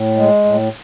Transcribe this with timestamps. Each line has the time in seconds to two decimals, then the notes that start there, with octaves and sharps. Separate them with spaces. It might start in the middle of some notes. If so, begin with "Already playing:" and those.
Already playing: A2
0.17 G#3
0.45 A2